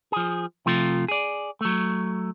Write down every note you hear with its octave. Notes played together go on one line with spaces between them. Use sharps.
F3 G#4
C3 F3 A3 F4
G#4 D5
F#3 A3